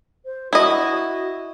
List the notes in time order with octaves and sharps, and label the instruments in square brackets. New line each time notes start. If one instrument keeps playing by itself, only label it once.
[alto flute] C5
[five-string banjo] E4 D#5 [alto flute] F#4